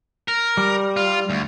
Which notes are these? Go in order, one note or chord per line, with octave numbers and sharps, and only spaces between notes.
A#4
G3
F4
D2